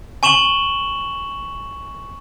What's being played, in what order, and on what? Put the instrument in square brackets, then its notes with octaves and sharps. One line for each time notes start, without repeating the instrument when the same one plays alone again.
[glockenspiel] G#5 C#6 E7 F#7 G7